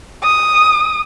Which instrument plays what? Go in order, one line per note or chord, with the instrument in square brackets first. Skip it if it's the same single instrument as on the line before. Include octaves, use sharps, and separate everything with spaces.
[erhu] D#6